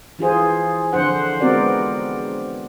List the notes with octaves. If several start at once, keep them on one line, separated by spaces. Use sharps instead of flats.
E3 F4 G#4 C5
D3 F3 C5 F#5
G#3 B3 C4 F#4 A#4 D5